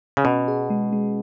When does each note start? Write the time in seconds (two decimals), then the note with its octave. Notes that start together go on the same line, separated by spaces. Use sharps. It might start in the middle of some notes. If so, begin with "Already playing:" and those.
0.17 C#3
0.24 B2 C#4
0.48 G#4
0.70 G#3
0.93 G#3